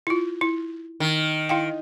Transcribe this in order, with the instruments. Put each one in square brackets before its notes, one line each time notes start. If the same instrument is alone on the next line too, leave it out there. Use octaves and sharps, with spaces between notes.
[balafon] E4 F4
E4
[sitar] D#3
[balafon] E4 F5 G5